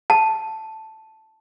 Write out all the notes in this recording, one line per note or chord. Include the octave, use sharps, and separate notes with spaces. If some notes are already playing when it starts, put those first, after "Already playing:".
A5